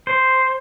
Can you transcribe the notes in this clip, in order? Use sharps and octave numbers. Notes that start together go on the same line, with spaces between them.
C5